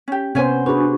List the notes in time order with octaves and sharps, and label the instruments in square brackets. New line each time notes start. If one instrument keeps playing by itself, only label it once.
[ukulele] C#4 G4
[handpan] C3 B3 C5 [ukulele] C#4 C#5 G#5
[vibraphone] D4 F#4 C#6 [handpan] G#4 B4